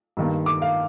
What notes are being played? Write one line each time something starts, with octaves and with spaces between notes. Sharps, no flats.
G2 D#3 A#3
D6
F5